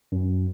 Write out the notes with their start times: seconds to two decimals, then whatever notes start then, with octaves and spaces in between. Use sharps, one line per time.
0.12 F#2